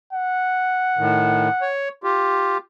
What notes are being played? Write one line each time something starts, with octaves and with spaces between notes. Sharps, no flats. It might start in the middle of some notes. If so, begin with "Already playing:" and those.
F#5
A2 D#3
C#5
F4 G4